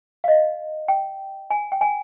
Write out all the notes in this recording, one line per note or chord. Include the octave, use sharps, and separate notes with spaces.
F5
D#5
G5
G#5
G5
G#5